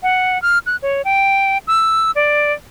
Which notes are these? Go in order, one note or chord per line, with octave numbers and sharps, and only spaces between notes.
F#5
F6
F#6
C#5
G5
E6
D5